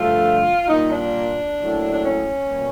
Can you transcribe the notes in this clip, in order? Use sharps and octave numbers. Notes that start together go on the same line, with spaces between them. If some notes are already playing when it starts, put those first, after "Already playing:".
Already playing: G2 D3 F3 A3 F4
A#2 G3 A#3 D#4
D4
A2 F#3 A#3
D4
C#4
B2 G3 A#3